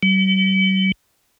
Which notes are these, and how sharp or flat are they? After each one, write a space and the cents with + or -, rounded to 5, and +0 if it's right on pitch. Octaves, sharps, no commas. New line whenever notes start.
G3 -45